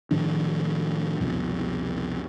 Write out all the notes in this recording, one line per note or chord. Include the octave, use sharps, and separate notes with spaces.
A2 D#3 F3 D4
C2 F2 B2